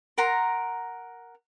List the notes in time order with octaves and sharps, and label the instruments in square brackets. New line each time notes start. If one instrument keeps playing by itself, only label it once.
[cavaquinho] A#4 F#5 A#5 C6